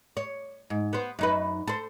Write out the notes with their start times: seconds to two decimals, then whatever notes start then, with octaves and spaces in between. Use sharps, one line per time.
0.17 C#5
0.70 G#2
0.93 B3 C5
1.19 F#2 D#4 B4
1.67 A4 C5